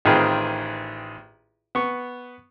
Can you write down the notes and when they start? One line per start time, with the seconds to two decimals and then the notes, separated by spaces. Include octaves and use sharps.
0.05 A1 D#3 C4 F4 G#4 B4
1.75 B3 C#6